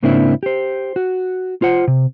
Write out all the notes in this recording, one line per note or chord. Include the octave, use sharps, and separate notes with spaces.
G#2 C#3 A#3 C4 D4 E4
G4 C5
F#4
F4 C5 F#5
C3